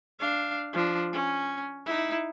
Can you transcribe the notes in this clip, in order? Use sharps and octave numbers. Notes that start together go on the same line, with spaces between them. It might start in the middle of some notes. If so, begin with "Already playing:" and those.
D4 F5
F3 D4
C#4
D#4 E4